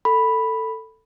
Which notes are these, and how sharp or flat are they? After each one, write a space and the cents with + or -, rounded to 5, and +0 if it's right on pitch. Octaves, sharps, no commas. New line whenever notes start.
A4 +15 B5 +0